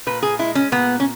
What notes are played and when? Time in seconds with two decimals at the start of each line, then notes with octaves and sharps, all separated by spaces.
0.06 A#2 B4
0.23 G#4
0.39 G#3 E4
0.55 C#4
0.72 A#2 B3
1.00 C#4